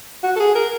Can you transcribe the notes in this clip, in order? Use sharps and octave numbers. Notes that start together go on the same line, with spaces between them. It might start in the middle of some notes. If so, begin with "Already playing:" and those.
F#4
A4
G#4
A#4